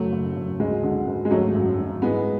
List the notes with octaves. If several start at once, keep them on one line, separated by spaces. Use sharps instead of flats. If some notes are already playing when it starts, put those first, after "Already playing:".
Already playing: F#1 F#3 A3
F#1
F#1
D2 G#3
D3
D2
G#3
G#1 F#3 A3
F#2
G#1
E3 G#3 B3